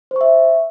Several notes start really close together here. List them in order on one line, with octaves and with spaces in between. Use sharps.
C5 C#6 E5